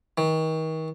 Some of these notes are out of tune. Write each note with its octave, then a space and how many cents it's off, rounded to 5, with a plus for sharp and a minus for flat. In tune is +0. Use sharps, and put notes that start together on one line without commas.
D#3 +35